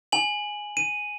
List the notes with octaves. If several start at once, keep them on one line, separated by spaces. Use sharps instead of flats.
G#5 F#7
D#7